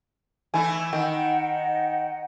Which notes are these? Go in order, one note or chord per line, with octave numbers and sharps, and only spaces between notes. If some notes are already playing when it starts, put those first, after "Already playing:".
E3 A3 E4 G#5
D#3 D#5 F#5 G5